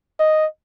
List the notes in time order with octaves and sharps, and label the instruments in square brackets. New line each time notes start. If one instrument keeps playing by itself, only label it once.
[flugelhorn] D#5